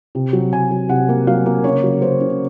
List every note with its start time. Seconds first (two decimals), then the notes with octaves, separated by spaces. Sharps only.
0.15 C3
0.33 F#3
0.53 C3 G#5
0.71 F#3
0.89 C3 F#5
1.09 A#3
1.27 F#3 F5
1.46 A#3
1.64 C#3 C#5
1.84 F#3
2.02 C#3 C5
2.21 C#3